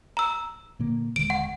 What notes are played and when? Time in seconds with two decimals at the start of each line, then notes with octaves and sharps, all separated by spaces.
0.17 A#5 E6
0.79 A#2 D3 A#3
1.16 D#1 D3 G#3 D7
1.30 F#5